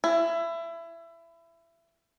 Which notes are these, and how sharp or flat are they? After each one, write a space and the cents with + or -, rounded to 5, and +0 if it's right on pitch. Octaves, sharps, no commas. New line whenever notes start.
E4 +25